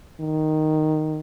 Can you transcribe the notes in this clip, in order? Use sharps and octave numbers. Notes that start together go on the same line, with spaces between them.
D#3